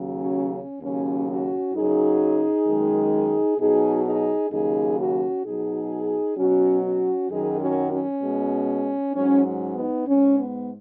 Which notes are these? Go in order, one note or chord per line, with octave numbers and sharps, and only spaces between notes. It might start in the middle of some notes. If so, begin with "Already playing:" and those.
Already playing: D#2 C#3 F#3
C#4 F#4
C#4
D#2 C#3 F#3 C#4
C#4 F#4
F#2 C#3 F#3 D#4 G#4
F#2 D#3 G#3
B2 F#3 D#4 G#4
D#4 G#4
D#2 C#3 F#3 D#4 G#4
C#4 F#4
B2 F#3 D#4 G#4
B2 F#3 C#4 F#4
C#4 F#4
F#2 D#3 F#3 D#4 G#4
C#4 F#4
C#4
B2 G#3
G#2 F#3 C#4
C#4
B3 D#4
G#2 G#3 C#4
B3